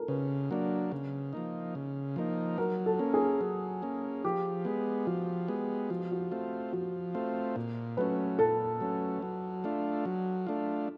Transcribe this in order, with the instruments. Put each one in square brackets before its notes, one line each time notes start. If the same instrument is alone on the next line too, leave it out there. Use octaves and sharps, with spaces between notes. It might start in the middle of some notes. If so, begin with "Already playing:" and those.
Already playing: [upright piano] A4 A#4
[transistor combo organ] C#3 [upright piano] B4
[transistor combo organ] F#3 A#3 D4
C#3
F3 A#3 D#4
C#3
F3 A#3 D#4
[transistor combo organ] F#3 [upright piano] A#4
[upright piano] A4
[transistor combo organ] A#3 C#4
[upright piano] G#4
[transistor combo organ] F#3
A#3 C#4
[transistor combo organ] F3 [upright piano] G4
[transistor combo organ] G#3 B3
[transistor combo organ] F3 [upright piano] F#4
[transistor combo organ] G#3 B3
[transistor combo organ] F3 [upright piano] F#4
[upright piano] G4
F#4
[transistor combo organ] A3 C4 F4
[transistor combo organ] F3 [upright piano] F#4
[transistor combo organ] A3 C4 F4
A#2
[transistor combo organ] F#3 A3 C#4 [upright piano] B4
[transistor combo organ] A#2 [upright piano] A4
[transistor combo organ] F#3 A3 C#4
F#3
A3 D4 F4
F#3
A3 D4 F4